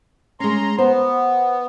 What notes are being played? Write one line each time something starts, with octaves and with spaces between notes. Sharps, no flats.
G#3 C#4 A#5 C6
B3 C5